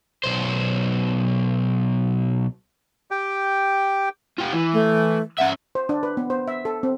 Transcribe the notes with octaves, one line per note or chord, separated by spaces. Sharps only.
B1 C5
G4 G5
F4 G4
E3
A3
C#4 E5 F#5
C5
D4
B4
B3
C5
E5
A4
C4